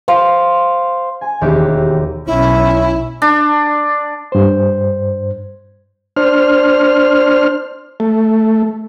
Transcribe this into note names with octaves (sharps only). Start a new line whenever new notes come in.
C5 F5
G#5
E1 D#2 F#4 G4 E5
B1 C#4 E4
D4
G2 C5
D4 C5 F6
A3